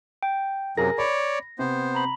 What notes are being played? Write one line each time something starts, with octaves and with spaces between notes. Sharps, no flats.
G5
F#2 C3 F#3 G#4 A#4 A#6
C#5 D5 B5
C3 B3 C5
A#5 B5